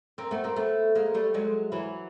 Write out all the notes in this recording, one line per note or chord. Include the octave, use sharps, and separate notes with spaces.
A#3 C4
A3 B3
A#3 C4
A3 B3
G#3 A#3
G3 A3
F#3 G#3
E3 F#3